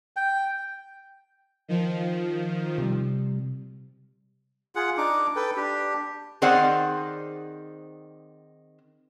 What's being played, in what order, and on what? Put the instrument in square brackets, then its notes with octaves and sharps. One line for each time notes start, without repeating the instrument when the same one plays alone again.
[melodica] G5
[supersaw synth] D#3 F3
[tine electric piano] C3 G3
[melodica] F4 G#4 F#5
D4 D#4 D6
A4 B4 G5
D4 G4
[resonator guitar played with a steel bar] D#3 C4 G#4 C5 D5 F#5